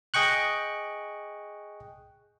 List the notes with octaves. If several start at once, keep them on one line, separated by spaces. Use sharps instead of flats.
G#4 D#5 G5 C#6 F#6